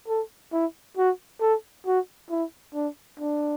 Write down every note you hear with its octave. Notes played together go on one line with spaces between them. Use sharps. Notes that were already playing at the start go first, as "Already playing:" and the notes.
A4
E4
F#4
A4
F#4
E4
D4
D4